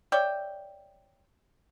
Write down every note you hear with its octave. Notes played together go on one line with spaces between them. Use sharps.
C#5 D5 E5 G5